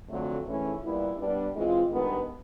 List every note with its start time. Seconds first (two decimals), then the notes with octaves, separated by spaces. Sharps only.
0.09 F2 D3 F#3 A3
0.45 G#2 E3 A3 C#4 E4
0.82 A#2 G3 B3 E4
1.18 G3 B3 D4
1.54 E3 G#3 C4 F4
1.91 G2 D#3 G#3 B3